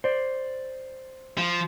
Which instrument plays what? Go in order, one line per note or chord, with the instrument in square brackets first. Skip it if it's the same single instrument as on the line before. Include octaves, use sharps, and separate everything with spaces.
[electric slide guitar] C5 D5
[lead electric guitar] F3